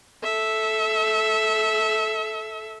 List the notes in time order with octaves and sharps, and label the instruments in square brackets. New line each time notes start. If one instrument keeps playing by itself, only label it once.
[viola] A4 E5